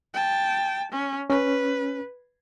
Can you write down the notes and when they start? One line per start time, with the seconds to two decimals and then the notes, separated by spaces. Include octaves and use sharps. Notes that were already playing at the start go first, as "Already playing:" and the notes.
0.14 G5 A5
0.92 C#4
1.30 C#4 B4